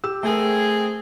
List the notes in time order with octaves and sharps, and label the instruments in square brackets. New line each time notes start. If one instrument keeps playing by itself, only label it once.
[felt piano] G4 E6
[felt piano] A3 A#4 [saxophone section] C4 G#4